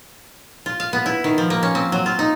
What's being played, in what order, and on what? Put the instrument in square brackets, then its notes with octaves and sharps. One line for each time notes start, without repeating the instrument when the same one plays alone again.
[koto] F4
F5
B3
E4
D#3
F3
A#3
C#4
C4
F#3
F4
D#4